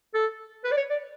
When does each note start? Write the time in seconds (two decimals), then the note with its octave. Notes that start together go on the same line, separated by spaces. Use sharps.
0.14 A4
0.64 B4
0.72 D5
0.77 C#5
0.90 D5